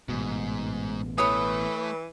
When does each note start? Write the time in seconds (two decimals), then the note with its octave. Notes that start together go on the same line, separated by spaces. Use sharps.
0.09 A1 G#2 B2
1.18 E3 A3 B4 C#5 D#6